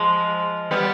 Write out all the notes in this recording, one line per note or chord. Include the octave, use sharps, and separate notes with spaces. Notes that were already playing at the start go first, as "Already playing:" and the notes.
Already playing: F3 G#3
G3 B3